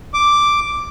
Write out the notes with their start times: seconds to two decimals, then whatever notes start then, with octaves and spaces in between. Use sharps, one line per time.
0.14 D6